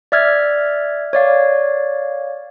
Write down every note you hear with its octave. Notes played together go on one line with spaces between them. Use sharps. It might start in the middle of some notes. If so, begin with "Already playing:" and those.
D5 E5 F6 G#6
C#5 D5 F5